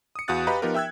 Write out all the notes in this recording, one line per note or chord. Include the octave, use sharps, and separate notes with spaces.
D#6 C#7
E2 F#4 F5 D#6 F#6 A6
G4 B4 D#5 F5 A#5 B5
F3 B3 D#4 F4 G4 A#4
E5 G5 E6 F#6 G#6